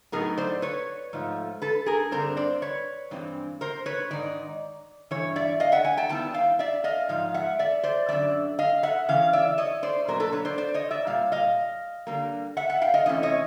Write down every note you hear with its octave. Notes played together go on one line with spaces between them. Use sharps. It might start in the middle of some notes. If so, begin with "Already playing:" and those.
A2 F#3 B3 D#4 G#4 A#4
C5 D5
B4 C#5
G#2 F3 A3
A4 B4
G#4 A#4
G2 D3 G3 C4 A#4 C5
C5 D5
B4 C#5
G2 E3 G#3 C4
A#4 C5
B4 C#5
G#2 D#3 D#4 D5
G2 E3 C#5
D5 E5
D#5 F5
E5 F#5
F#5 G#5
G5 A5
D#3 G3 B3 E4 G5 A5
F5 G5
D5 E5
D#5 F5
G#2 F3 F5
E5 F#5
D5 E5
C5 D5
F#2 D3 G3 D5 E5
D#5 F5
E5 F#5
C#3 E3 F5
D5 E5
C#5 D#5
C5 D5
B2 F#3 A#3 D4 A#4 C5
A4 B4
B4 C#5
C5 D5
C5 D5
C#5 D#5
D5 E5
A#2 G3 F5
D#5 F5
D3 G3 A#3
E5 F#5
E5 F#5
F5 G5
D#5 F5
C3 E3 A3 C#4 E4 D#5
C#5 D#5